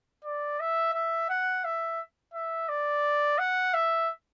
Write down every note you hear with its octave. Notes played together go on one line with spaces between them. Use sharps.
D5
E5
E5
F#5
E5
E5
D5
F#5
E5